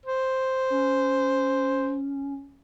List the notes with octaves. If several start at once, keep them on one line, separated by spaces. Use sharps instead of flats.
C5
C#4